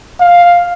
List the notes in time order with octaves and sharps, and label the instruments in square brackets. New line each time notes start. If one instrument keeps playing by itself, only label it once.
[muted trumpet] F5